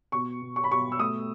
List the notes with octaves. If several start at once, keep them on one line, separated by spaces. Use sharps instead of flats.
B2 C#6
B2
C#6
B5
B2 C#6
E6
A3 D#6